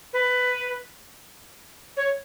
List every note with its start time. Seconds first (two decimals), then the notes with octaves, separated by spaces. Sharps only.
0.13 B4
1.97 C#5